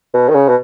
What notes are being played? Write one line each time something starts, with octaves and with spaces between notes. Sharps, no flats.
B2
D#3
C#3
B2